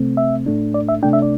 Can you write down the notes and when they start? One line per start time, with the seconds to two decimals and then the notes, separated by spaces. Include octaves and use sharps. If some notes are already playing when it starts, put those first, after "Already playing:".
Already playing: C3 A3 C4
0.17 E5
0.46 A2 A3 D4
0.74 D5
0.89 E5
1.03 C3 A3 D4 G5
1.13 E5
1.22 D5